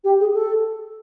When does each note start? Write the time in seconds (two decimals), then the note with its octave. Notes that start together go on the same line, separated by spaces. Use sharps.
0.04 G4
0.20 G#4
0.33 A4